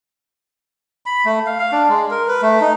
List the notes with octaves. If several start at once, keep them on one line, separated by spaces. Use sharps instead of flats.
B5
A3
F5
F5
D4
G#3
A#4
B4
A3
D#4